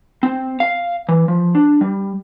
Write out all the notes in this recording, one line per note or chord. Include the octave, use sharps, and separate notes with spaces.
C4
F5
E3
F3
D4
G3